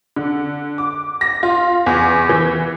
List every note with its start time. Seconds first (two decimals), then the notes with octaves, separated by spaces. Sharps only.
0.16 D3
0.78 D6
1.21 A#6
1.43 F4
1.86 E2
2.29 E3